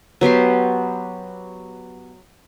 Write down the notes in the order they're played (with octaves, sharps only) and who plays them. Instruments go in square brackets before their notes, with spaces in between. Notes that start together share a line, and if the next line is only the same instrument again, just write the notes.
[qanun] F#3 B3 G4 C6